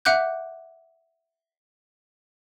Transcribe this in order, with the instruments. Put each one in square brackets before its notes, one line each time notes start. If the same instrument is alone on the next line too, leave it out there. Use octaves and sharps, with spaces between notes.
[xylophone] E5 F#5 D6 F#6 G6